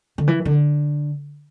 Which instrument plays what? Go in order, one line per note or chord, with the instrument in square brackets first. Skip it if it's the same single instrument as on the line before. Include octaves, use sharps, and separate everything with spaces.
[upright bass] D3
E3
D3